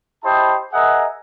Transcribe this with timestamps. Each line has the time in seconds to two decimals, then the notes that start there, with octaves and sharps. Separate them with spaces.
0.24 E4 G4 C5 D#5 A5
0.73 G#4 A#4 D#5 E5 F#5